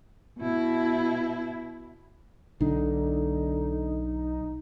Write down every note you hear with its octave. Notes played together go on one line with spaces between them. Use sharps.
B2 E4
B1 D3 D4 D#4